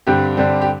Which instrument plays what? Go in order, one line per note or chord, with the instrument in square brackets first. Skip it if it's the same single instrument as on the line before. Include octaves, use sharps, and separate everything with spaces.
[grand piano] G2 D3 G3 C4 G4
G2 D3 G3 C4
G4